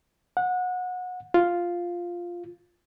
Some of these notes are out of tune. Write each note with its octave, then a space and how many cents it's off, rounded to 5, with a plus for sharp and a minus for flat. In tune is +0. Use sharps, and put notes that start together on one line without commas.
F#5 -25
F4 +0